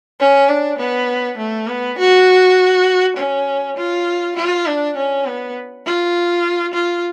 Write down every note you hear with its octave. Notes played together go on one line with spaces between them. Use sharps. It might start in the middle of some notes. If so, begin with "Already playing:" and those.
C#4
D4
B3
A3
B3
F#4
C#4
F4
F4
D4
C#4
B3
F4
F4